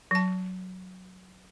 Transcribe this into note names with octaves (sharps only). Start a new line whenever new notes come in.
F#3 A5